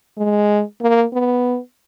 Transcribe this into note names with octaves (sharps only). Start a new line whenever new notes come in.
G#3
A#3
B3